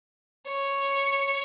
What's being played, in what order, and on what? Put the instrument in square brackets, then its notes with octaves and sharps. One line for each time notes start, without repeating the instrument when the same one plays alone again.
[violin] C#5